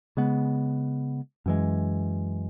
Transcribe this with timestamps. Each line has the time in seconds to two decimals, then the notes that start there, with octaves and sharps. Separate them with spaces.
0.17 C#3 G#3 B3
1.46 F#2 E3 G#3